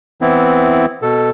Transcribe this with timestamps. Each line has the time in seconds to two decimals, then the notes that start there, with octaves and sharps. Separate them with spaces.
0.21 E3 B3 C4 E4
1.02 B2 A4